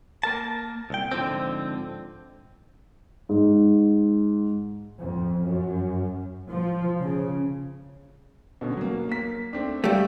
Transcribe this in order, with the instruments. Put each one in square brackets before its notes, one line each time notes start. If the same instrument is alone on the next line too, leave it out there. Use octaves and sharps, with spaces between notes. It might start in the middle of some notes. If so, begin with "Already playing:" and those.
[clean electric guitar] A#3 A#4 A5
C2 G5
G#2 D3 F3 C4
[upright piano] G#2
[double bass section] F2
F#2
F3
C#3
[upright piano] B2 D3 C#4
F#3 A#3
A#3 B6
A3 C4 D4
[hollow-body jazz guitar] G3 A3 [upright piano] G4 F5